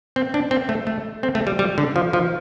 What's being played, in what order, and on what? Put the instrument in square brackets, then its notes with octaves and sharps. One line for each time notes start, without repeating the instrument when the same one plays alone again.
[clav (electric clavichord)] C4
D4
C4
A3
A3
C4
A3
G3
G3
D3
F3
F3